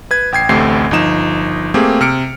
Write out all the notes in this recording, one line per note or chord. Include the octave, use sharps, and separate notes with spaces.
B4 G#6
A1 G5 G#6 C7
A1 D2 A3 C4 G4 C7
G1 F3 D#4 E7
A3 A#3 C4 G4 G#4
C3 F6 C#7 D7